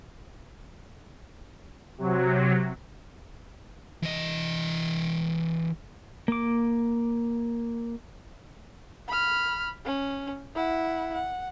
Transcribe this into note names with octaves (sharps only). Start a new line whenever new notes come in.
C3 F#3
E3 D#5
A#3 D6
B5 F6
C#4
E4 F#5
F#5